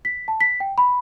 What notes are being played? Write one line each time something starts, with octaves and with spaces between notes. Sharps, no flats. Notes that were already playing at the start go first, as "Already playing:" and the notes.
B6
A5
B6
G5
B5